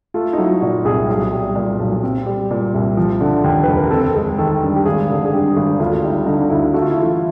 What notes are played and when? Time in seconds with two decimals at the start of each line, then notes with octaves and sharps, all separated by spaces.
0.14 A3 F4
0.33 D#4
0.38 F#3 E4
0.61 A#2 F#4
0.85 C2 G#4
1.09 B1 G#4
1.33 G3
1.55 A#2
1.79 B1
2.03 C4
2.26 G3
2.51 A#2
2.74 C2
2.97 F3
3.21 D3
3.44 D#2
3.64 F1 B4
3.78 A#4
3.91 C4 A4
4.16 G#3
4.38 D#3 A4
4.63 G2
4.76 G4
4.86 G#1 G#4
5.09 D3
5.25 G#4
5.32 G2 G4
5.57 G#1
5.79 D2 F4
6.04 G3 D#4
6.26 D3 D#4
6.50 D2 E4
6.74 A3 F#4
6.82 F4
6.91 E4
6.98 E3 F4